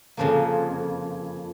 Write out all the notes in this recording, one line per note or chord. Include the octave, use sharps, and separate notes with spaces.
F2 C#3 F3 A#3